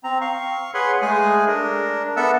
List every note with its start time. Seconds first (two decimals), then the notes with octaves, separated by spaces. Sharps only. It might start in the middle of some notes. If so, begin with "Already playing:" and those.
0.04 C4 A#5
0.21 F5 C#6
0.74 G#4 B4 C#5 F#5 B5 C6
1.02 G#3 A3 G#4 G#5
1.47 D4 A#4
2.17 B3 A4 E5 F#5 E6